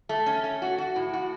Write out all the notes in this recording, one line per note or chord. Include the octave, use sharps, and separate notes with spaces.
A3
C#4
A3
F#4
F#4
A2
F#4